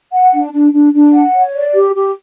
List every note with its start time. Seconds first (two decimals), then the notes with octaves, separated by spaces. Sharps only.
0.12 F#5
0.33 D4
0.53 D4
0.73 D4
0.93 D4
1.14 F#5
1.34 C#5
1.54 D5
1.74 G4
1.95 G4